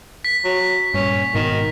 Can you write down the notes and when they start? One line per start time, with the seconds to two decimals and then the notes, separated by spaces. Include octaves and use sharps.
0.25 B6
0.44 F#3
0.94 G2 A#2 C#4
1.35 G#1 G#2 B2 D#3